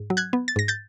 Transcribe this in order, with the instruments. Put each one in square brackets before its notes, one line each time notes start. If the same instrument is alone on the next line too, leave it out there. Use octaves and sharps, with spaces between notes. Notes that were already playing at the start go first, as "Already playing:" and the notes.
Already playing: [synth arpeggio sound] G#2
F#3
F#6 G#6
B3
A6
G#2 A#6
G6 A6